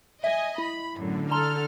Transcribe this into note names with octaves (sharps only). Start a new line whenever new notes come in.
D#5 E5 G#5
E4 B5
F#2 A2 D3
A4 A5 A#5 C6 F6